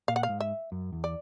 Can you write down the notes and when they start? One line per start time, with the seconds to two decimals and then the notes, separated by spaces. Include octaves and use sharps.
0.08 A#2 F5
0.16 F#5
0.23 F5
0.29 G#2
0.40 E5
0.72 F#2
0.93 E2
1.04 D5